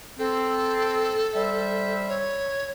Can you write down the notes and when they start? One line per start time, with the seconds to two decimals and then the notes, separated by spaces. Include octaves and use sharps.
0.19 C4 A4
1.34 G3 C5 E5
2.09 C#5